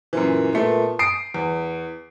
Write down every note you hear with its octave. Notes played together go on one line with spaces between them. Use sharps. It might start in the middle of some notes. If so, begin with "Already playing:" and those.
F#2 A#2 E3
A#2 A3 B3
D#6 C7 D7
E2